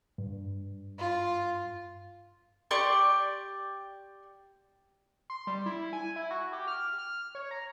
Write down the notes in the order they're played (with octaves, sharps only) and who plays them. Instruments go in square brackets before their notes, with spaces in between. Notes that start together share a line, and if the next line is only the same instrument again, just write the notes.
[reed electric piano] G2
[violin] F4
[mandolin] G4 D5 C6 C#6
[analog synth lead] C6
G3
E4
G#5
E4
F#4
G4
F6
F6
C#5
A#5